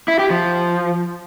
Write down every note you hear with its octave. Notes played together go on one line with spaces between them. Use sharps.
E4
G4
F3